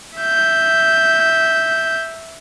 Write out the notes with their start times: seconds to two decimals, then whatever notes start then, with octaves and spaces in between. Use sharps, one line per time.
0.19 E5 G6